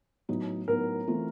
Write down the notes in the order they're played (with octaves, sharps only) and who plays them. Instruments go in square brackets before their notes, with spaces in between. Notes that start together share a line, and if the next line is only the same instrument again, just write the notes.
[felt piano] A2 F#3 B3 D#4
[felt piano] A2 F#3 B3 D#4 [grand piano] A#4
[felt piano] E3 A3 C4 F4